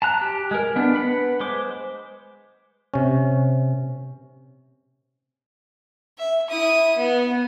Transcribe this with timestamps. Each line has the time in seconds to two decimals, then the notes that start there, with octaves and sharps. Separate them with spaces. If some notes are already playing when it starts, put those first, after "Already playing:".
0.02 A5 A#5 F#6
0.21 G4
0.51 G#3 A#4
0.76 B3 D4
0.95 B4 F#5 B5
1.40 G#3 C5 D6
2.94 C3 C#4
6.18 E5
6.48 E4 D#6
6.96 B3